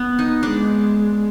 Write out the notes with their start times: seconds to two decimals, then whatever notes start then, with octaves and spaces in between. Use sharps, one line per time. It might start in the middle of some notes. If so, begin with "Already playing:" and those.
Already playing: B3
0.19 D#4
0.43 G#3 D4